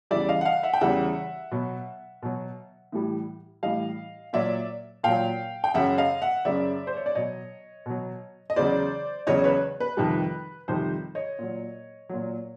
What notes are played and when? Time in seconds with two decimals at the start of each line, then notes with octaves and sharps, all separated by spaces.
0.11 E2 C#3 E3 G3 D5 E5
0.29 D#5 F5
0.41 F#5
0.45 D#5 F5
0.63 E5 F#5
0.74 G5
0.81 E2 C#3 E3 G3 E5 F#5
1.51 B2 F#3
2.22 B2 F#3
2.92 A2 E3 G3
3.63 A2 E3 G3 D#5 F5
4.33 A#2 F#3 D5 E5
5.04 A#2 F#3 F5 G5
5.64 G5
5.74 F#2 C#3 F#3 E5 F#5
5.98 D#5 F5
6.21 E5 F#5
6.45 F#2 C#3 F#3 D5 E5
6.87 C5
6.97 C#5
7.06 D5
7.15 B2 F#3 C#5 D#5
7.86 B2 F#3
8.50 D#5
8.56 E2 C#3 F#3 C5 D5
9.27 E2 C#3 F#3 C#5 D#5
9.44 B4 C#5
9.80 B4
9.97 F2 C3 D#3 G3
10.68 F2 C3 D#3 G3 C5
11.15 C#5 D#5
11.39 A#2 F#3
12.09 A#2 F#3